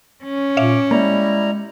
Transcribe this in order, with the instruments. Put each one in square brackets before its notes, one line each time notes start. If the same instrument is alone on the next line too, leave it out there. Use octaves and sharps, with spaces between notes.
[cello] C#4
[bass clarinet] A#2 [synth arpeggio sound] C#5 E5 F5 [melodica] D6
[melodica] G3 E4 A#5 [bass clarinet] G#3 [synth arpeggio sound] A#3